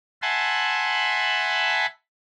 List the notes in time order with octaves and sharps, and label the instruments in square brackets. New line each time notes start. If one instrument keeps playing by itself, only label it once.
[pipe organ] E5 F#5 G#5 A5 B5 C6